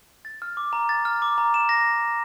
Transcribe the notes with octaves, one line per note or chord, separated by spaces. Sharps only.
A6
F6
D6
A#5
A6
F6
D6
A#5
E7
A#6